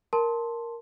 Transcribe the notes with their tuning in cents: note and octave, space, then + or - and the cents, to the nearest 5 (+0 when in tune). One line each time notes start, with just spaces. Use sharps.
A#4 +0 A5 +0 C6 +0